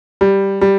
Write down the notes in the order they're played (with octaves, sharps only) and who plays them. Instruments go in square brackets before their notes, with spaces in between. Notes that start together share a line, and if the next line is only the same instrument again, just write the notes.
[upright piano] G3
G3